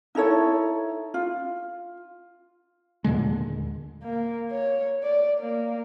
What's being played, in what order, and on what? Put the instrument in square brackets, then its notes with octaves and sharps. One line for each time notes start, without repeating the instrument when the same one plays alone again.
[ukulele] D#4 E4 A4 C#5
F4
[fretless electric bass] D#2 A#2 D3 G#3
[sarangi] A#3
C#5
D5
A#3